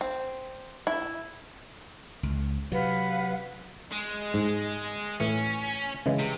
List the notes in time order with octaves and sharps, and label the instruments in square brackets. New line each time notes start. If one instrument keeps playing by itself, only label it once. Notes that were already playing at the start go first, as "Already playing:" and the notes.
[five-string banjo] C4
E4
[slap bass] C#2
[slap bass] C3 F#3 [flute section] B4 F5 F#5
[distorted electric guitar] G#3
[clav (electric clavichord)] G#2
[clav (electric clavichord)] A2 E3 [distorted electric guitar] C#4
[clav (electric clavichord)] C#3 E3 G#3
[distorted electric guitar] C3